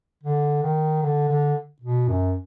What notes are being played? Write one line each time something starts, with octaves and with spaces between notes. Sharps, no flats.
D3
D#3
D3
D3
B2
F#2